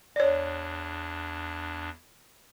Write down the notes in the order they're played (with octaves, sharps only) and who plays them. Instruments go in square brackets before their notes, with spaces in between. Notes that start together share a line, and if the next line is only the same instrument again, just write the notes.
[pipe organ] E2 D4 [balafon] C#5 D5